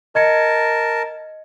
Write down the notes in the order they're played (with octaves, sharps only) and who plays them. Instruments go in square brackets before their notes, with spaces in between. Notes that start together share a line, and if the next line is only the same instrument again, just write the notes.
[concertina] A#4 A5 [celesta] D#5 G#6 C#7